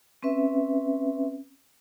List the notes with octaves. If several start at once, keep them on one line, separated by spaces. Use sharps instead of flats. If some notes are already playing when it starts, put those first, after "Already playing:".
C4 C#4 B4 E5